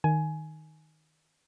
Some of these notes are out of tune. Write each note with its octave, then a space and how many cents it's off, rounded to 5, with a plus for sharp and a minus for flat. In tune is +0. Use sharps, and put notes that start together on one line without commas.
D#3 +0 G#5 +15